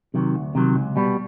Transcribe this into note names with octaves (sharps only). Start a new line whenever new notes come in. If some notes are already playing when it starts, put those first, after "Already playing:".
C3 D#3 F#3
D2
C3 D#3 F#3
C#2
B2 G3 B3